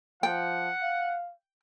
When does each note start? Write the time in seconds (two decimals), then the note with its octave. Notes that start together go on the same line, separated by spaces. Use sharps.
0.23 F3 F#5 G5
0.82 F5